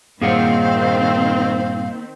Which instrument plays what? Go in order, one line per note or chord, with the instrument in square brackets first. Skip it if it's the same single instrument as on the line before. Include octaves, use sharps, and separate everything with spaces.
[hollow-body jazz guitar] G2 A#2 [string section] D#3 C4 [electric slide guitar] A#3 G#4 F#5 [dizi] F5